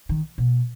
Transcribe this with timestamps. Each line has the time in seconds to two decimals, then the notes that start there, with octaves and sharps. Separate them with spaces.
0.09 D#3
0.38 B2